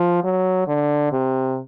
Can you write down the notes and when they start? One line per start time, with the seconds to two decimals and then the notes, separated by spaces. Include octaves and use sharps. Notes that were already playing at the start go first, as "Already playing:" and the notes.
Already playing: F3
0.24 F#3
0.68 D3
1.12 C3